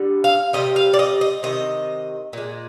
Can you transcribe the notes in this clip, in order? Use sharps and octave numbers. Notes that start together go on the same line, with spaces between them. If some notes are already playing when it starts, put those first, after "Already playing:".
Already playing: D3 G3
F5
C3 D#3 G3 D#5
F5
D5
D#5
D#5
C3 D#3 D#5
A#2 G#3